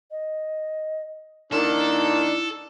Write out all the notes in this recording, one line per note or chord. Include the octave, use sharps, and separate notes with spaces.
D#5
D#3 A#3 D4 E4 A4